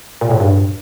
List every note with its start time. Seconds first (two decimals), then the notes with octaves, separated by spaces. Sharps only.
0.21 A#2
0.31 A2
0.40 G2